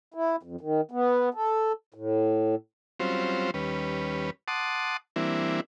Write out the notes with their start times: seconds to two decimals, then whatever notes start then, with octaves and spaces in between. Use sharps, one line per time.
0.14 E4
0.43 F2
0.61 D#3
0.91 B3
1.34 A4
1.94 A2
3.00 F#3 G3 C4 C#4 F4 C5
3.54 D#2 G3 C#4 B4
4.48 F#5 A5 C6 D6 D#6
5.16 E3 G3 A#3 C4 D4 E4